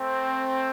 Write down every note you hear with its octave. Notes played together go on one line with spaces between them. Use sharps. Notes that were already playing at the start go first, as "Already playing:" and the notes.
Already playing: A3 C4